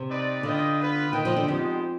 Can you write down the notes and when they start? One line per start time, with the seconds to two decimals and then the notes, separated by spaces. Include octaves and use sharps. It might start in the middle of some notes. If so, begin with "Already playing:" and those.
Already playing: C3
0.09 C4 D#4 B4 D5
0.43 D3 D4 F4 B4 D#5 G5
0.79 B3 F4 B4
1.13 D#3 F4 B4 D#5 G5
1.25 F3
1.36 D3
1.48 F2 G#3 B3 D#4 G4 C5